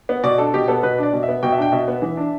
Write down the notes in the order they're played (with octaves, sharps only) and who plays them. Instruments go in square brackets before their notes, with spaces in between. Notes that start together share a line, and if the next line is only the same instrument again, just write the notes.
[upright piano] B3
B2 D5
D4 A4
B2 G4
B3 A4
B2 B4
D4 D5
B2
E5
B3
B2 G5
E5
D4 G5
B2 E5
B3
E3
D4